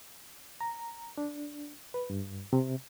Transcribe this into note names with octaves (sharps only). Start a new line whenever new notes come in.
A#5
D4
B4
G2
C3